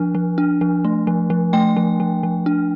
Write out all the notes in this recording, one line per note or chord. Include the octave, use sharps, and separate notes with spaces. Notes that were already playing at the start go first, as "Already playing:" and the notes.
Already playing: F3 D4
F3
D4
F3
A3
F3
F3
A3 G5
F3
F3
F3
D4